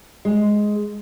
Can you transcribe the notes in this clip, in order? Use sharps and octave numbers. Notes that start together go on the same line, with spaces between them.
G#3